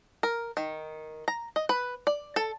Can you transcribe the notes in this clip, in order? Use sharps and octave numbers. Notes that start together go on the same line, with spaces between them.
A#4
D#3
A#5
D#5
B4
D5
A4